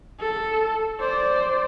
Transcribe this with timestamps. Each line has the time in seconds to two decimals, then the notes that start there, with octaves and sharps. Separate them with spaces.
0.20 A4
1.00 C5 D5